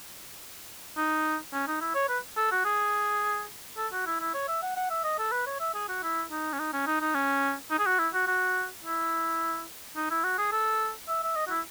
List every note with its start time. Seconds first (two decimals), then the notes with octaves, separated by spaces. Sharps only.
0.97 D#4
1.53 C#4
1.67 D#4
1.81 E4
1.95 C#5
2.09 B4
2.37 A4
2.51 F#4
2.65 G#4
3.77 A4
3.92 F#4
4.06 E4
4.21 E4
4.34 C#5
4.48 E5
4.62 F#5
4.76 F#5
4.90 E5
5.04 D#5
5.19 A4
5.32 B4
5.46 C#5
5.60 E5
5.74 G#4
5.89 F#4
6.03 E4
6.31 D#4
6.53 C#4
6.59 D#4
6.73 C#4
6.87 D#4
7.01 D#4
7.14 C#4
7.71 D#4
7.79 G#4
7.86 F#4
7.99 E4
8.14 F#4
8.27 F#4
8.84 E4
9.96 D#4
10.10 E4
10.24 F#4
10.38 G#4
10.52 A4
11.08 E5
11.23 E5
11.36 D#5
11.47 F#4
11.50 E4